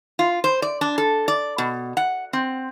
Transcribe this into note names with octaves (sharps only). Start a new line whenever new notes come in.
F4
C5
D5
D4
A4
D5
B2
F#5
C4